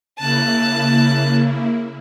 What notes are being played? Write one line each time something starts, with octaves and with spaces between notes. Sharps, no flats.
C#3 A#3 E4 A5 F#6